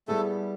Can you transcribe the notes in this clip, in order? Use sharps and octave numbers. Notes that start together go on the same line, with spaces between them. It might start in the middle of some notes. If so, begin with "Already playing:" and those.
G3 A3 B3 E4 G#4 A4